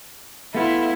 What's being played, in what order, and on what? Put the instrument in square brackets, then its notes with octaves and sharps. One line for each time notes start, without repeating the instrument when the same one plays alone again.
[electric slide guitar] A3 B3 F4 [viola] E4